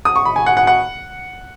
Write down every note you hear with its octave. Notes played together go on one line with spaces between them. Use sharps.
D#6
C#6
B5
G#5
F#5
F#5
F#5